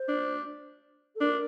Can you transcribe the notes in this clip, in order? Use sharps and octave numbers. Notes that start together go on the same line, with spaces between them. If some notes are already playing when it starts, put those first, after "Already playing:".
Already playing: C5
D4
A4
D4 A#4